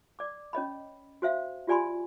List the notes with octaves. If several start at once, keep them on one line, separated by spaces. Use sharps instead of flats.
D5 D6
C#4 C#5 D#5 B5
F#4 C5 E5 F5
F4 G4 D5 G#5 B5 C6